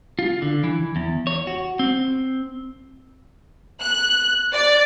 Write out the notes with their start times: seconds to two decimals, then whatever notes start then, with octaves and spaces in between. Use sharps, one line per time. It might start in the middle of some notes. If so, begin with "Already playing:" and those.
0.19 F4
0.42 D3
0.64 E3
0.96 E2
1.27 C#5
1.47 F#4
1.79 C4
3.82 F#6
4.53 D5